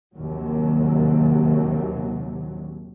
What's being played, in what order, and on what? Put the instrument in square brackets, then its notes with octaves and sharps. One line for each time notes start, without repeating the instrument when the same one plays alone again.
[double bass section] A#1 D#2 C3 F#3